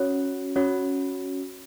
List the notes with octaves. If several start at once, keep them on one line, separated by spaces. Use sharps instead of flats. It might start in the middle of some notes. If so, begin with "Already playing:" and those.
Already playing: C#4 F#4 C#5
C#4 F#4 C#5